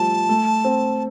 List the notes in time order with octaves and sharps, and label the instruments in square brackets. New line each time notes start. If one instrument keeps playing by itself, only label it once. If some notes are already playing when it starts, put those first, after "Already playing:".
Already playing: [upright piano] F3 G3 A3 [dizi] A5
[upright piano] A3
C4